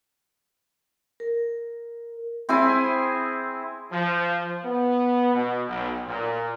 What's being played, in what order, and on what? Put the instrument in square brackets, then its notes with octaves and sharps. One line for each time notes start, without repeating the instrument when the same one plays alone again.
[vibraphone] A#4
[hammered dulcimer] C4 E4 G#4 G#5
[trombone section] F3
B3
B2
B1
A#2